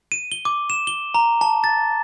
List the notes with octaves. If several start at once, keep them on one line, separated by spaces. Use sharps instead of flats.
D#7
G7
D6
E7
G7
A#5
A5
A6